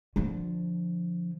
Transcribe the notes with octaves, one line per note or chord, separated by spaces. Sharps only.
D3 F3